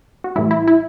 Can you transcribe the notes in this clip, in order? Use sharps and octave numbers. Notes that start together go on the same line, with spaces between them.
F#4
A2 E3 G3 E4
E4
E4